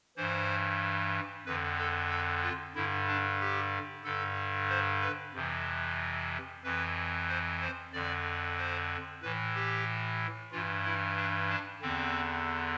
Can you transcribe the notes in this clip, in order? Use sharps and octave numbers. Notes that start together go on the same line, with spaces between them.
G2 E3 C5
F2 D3 B4
A4
A4
F4
G2 D3 E4
D4
G4
G2 D3 A4
C5
B4
F2 C3 E3
F2 E3 B4
C5
C5
F2 D3 D5
C5
A2 E3 B4
G4
G2 E3 F4
E4
D4
D4
E2 D3 C4